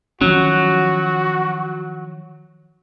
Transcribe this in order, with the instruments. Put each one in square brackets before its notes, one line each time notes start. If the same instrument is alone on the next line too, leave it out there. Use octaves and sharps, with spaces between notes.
[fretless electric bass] D#3 F3 C#4 [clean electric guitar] F#3 [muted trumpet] F#4